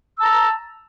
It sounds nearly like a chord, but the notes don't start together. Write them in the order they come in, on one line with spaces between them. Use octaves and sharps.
E6 A5 A#5